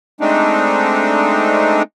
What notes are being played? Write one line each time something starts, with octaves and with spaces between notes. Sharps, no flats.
G#3 A3 C4 D4 D#4